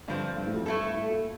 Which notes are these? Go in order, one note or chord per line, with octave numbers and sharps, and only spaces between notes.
G2 D3 F3 C4
G2
A2
F2
G2 A3 E4 A4
A2
A#2